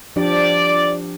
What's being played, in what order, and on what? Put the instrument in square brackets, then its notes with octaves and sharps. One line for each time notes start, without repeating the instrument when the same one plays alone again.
[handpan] F3 D4 G4 [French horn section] D5